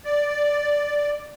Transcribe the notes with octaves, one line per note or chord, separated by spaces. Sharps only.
D5